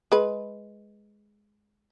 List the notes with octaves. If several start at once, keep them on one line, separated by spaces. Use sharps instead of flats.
G#3 B4